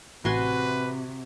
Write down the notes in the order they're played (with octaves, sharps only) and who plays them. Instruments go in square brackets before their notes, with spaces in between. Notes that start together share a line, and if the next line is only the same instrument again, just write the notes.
[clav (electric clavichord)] A1 [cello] C3 [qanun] F#4 G#5 C6 [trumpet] B4